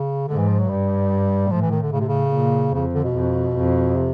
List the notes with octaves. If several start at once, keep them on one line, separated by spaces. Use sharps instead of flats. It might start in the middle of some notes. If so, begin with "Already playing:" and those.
Already playing: C#3
G#2 D3
E3
F3
F#3
G2 G3
A2 F3
E3
D#3
D3
A2 C#3
C3
C#3
A#2
F2 C#3
D3
B2
F2
F2
C3